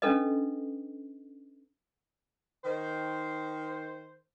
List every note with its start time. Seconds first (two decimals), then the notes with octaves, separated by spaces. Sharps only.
0.02 C#4 D4 A4 B4 D#5
2.64 D#3 C5